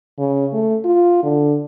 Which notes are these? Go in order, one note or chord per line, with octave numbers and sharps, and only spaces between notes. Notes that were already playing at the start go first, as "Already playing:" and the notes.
C#3
A3
F4
D3